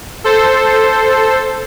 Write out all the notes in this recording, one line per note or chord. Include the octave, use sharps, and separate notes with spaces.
A4 C5